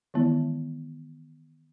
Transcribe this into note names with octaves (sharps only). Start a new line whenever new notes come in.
D#3 E3 G#3 B3 E4